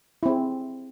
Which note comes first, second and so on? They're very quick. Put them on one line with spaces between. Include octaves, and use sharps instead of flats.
E4 C4 G#4